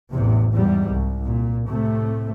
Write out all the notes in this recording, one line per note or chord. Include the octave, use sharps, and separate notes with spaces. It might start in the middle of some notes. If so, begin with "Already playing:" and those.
A1 E2 C3
E2 G#2 G3
C2
A#2
A2 C3 A3